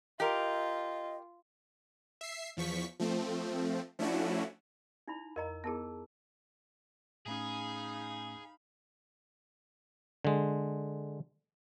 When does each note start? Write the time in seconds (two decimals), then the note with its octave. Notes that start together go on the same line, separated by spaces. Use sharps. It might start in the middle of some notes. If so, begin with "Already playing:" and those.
0.20 F4 G4 A#4 D#5
2.21 E5 C7
2.57 E2 F3 C#6 B6
3.00 F3 A3 C4
3.99 F3 A3 C#4 D4 E4 F#4
5.08 D#4 E4 B5
5.36 F2 A#4 D#5 A#5
5.64 B3 E4 G#4 A#4 A5
7.26 A2 A3 C#4 D#4 G#4 F5 B5
10.25 D3 G#3